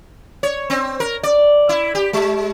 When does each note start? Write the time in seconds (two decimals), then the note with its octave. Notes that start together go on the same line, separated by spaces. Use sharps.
0.43 C#5
0.70 C4
1.00 A#4
1.23 D5
1.69 E4
1.95 G4
2.13 G#3